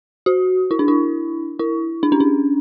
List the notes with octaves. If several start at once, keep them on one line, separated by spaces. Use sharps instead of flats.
F#4
E4
D4
E4
E4
D4
C#4
D4